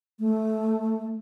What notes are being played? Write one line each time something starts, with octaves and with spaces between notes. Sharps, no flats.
A3